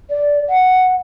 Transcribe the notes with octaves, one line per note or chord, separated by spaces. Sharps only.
D5
F#5